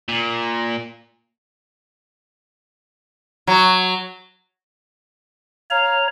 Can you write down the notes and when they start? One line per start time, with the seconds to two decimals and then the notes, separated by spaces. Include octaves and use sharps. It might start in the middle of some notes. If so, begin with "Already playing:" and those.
0.08 A#2
3.47 F#3
5.71 C#5 F5 A#5